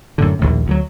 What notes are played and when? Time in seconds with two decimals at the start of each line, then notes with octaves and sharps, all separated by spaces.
0.18 F#2 A2 D3
0.39 A#1 D#2 A2
0.67 D2 D#3 F#3